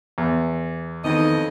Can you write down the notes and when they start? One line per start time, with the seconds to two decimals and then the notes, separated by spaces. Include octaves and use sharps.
0.18 E2
1.05 F2 A2 D#3 B3 D#4 D#5